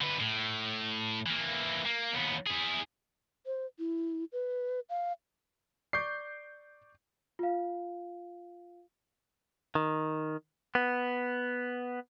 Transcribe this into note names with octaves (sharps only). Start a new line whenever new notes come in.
D3 B4
A2
E3 A#3
A#3
D#2 B3
E4 G#4
C5
E4
B4
F5
D5 C#6 D6 G6 C7
F4 F5
D#3
B3